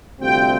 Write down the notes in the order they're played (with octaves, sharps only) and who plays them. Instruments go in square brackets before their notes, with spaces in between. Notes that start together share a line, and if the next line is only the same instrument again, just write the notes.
[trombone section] D2 C3 G3 C4 F4 [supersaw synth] G5